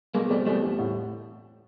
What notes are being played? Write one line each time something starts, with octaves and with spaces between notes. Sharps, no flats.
B2 G#3 A#3
G3 A3 C4
E2 G3 A3
G3
A2